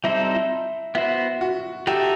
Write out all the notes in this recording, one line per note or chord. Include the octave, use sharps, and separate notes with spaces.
G3 C4 D#4 E4 A4 C5
E4
B3 E4 F#4 C5
F#4
D#4 F#4 G4 A4 E5